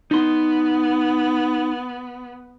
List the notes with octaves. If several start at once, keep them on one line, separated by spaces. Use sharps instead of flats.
B3 D#4 C6